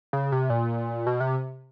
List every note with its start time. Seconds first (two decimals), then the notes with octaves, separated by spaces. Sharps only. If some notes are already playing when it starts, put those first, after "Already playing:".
0.13 C#3
0.32 C3
0.50 A#2
1.07 B2
1.20 C3